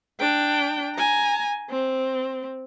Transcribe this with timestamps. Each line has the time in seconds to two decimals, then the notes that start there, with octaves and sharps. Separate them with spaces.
0.20 D4 G5
0.95 G#5 A#5
1.70 C4